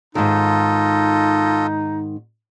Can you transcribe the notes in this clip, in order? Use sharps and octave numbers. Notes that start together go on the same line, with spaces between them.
G#2 D#3 D#4 F4 A4 D#5